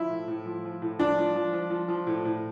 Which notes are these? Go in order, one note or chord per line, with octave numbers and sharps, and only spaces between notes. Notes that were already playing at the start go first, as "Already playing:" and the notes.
Already playing: F3 E4
A2
A2
F3
F3
A2
F3 D4
F3
F3
F3
F3
F3
A2
A2